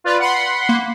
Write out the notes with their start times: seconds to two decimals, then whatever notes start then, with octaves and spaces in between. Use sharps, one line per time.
0.04 F4 B4 D5
0.20 F#5 B5 C6
0.69 A#3